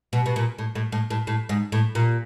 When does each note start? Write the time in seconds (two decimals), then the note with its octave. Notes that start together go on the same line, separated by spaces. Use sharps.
0.13 B2
0.26 B2
0.36 A#2
0.58 A2
0.75 A2
0.92 A2
1.10 A2
1.27 A2
1.49 G#2
1.72 A2
1.95 A#2